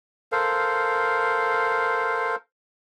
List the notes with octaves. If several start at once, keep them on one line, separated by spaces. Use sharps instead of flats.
A4 A#4 C5 F5